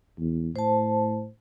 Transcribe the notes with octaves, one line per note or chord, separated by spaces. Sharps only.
E2
A2 C5 A5